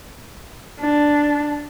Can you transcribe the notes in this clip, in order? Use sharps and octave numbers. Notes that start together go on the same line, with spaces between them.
D4